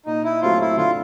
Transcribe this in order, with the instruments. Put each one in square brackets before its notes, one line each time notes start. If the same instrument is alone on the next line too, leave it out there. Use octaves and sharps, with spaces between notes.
[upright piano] A#2 [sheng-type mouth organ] D#4
[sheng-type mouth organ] E4
[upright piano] F#3 A3 C4 [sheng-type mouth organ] F4
[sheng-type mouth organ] E4
[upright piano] D3 [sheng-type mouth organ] F4